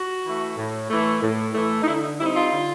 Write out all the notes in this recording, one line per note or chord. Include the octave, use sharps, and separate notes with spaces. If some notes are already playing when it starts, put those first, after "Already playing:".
Already playing: F#4
E3 A3
A2
E3 A3
A2
E3 A3
D#4
D3 E4
D#4
G3 C4 D#4 E4
F4
D3